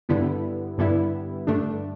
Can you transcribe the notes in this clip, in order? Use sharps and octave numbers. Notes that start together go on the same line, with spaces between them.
G2 D3 G3 B3 E4
G2 D3 G3 B3 E4
G2 D3 A3 D4